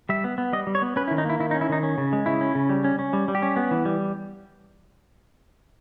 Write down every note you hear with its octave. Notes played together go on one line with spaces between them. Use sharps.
G3 E5
B3
B3
G3 D#5
G3
C#5
B3
C#4 B4
E4
D#3
D#4
A#3 E4
D#3 E4
D#4
C#4
E4
D#3 D#4
C#4
C#3
G#3
C#3 E4
C#4
C#3
G3
C#4
C#4
G3
G3
G4
C#4
B3
E3
G3